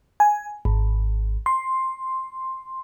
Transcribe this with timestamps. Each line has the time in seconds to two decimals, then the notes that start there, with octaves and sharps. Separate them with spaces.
0.20 G#5
0.65 G#1
1.46 C6